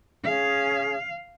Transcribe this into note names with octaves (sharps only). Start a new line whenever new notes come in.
C#4 G#4 F5